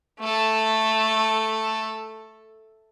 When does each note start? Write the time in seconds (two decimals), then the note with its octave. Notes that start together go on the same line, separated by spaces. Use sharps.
0.20 A3 A4